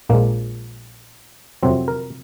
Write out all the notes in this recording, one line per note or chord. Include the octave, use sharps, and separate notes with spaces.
A#1 A#2 F3 G#3 A#3
F2 C3 F#3 C4
A#4